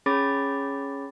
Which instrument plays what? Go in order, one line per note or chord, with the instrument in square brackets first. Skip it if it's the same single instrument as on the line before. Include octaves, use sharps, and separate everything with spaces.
[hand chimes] C#4 G#4 C#5 B5 D6 A6